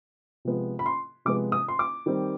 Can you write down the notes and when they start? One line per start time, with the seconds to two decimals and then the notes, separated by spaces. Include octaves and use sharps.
0.45 C3 F3 G#3 B3
0.79 B5
0.86 C6
1.25 C3 F3 G#3 B3 D6
1.52 D#6
1.68 C6
1.79 D6
2.06 D#3 G3 C4